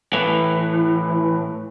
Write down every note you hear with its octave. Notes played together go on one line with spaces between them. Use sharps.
A2 E3